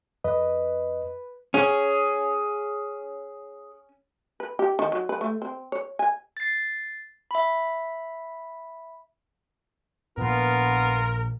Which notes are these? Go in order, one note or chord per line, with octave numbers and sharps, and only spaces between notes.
F2 B4 D#5
C#4 G#4
B4
G4
D#3
F#3
B4
A3
C4
C#5
G#5
A6 C7
E5 B5
A#2 F3 B3 F4 A#4